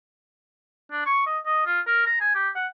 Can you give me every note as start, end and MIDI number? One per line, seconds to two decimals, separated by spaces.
0.92 1.04 62
1.06 1.23 85
1.26 1.38 75
1.46 1.65 75
1.66 1.80 65
1.87 2.04 70
2.06 2.19 82
2.20 2.34 80
2.35 2.49 67
2.56 2.67 78